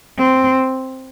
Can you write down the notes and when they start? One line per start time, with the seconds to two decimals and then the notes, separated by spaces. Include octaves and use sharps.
0.18 C4